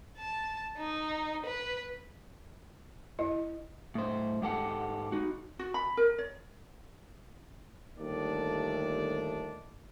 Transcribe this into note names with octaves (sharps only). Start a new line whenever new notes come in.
A5
D#4
B4
E4 D#5
A2 C5
G#2 G4 A4 F#5
D#4 F#4
F#4
B5
A#4
C#5
G1 D#2 D#3 A3 D4 D5